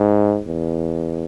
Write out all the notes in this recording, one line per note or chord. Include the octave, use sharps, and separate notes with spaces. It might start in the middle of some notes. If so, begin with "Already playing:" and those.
Already playing: G#2
E2